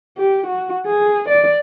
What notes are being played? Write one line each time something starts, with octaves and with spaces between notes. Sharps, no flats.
G4
F#4
G#4
D5